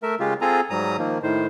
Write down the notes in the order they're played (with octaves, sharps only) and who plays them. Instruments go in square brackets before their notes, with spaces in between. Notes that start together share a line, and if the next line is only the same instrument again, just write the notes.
[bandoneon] A3 A#4 E5
C#3 G#3 F4 G4
C4 F4 G#4 A4 G#5 A#5
G#2 F#3 G3 A#5 D#6
D#3 F3 A#3
A2 D#3 C5